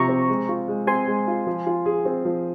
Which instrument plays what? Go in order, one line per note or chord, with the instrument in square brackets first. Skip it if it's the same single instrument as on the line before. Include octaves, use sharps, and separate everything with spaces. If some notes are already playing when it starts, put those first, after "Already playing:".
Already playing: [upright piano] C3 F3 [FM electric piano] A#5 C#6
[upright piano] C4
G#3
F4
G#3
[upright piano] C4 [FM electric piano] G#5 C6
[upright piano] G#3
F4
F3
F4
G#4
C4
F3